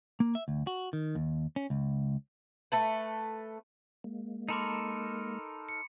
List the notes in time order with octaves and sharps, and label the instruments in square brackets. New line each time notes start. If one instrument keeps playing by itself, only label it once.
[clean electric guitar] A#3
E5
D2
F#4
D#3
D#2
C#4
C#2
[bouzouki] A3 A4 B4
[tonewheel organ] G#3 A#3
[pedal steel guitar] D#4 A4 A#4 [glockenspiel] B5 C6 D6
[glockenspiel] C#7